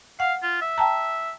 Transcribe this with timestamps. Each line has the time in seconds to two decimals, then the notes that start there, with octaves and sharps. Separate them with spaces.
0.20 F5 F#5
0.43 F4
0.61 E5
0.78 G5 A5 A#5